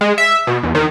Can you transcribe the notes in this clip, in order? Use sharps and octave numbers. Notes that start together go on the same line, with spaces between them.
G#3
E5
B2
E2
D#3